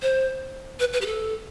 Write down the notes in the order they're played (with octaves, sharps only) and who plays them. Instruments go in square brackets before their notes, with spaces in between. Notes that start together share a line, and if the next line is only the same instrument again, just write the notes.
[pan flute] C5
B4
B4
G4
A4